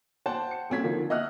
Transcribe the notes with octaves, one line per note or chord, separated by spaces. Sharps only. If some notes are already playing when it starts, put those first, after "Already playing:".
C5 F#5 G5 A5
C#7
D#1 A#2 C4 C#4 G#6 B6
D3 D#3 F3
D#5 E5 F#5 D#6 F6 F#6